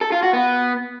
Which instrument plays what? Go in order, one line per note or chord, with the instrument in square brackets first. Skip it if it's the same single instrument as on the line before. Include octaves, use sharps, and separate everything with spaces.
[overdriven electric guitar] A4
F4
F#4
B3